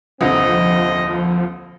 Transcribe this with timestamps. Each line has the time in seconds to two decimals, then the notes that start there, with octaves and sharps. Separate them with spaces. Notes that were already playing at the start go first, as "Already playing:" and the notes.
0.21 D#1 C2 D3 F3 C4 D#5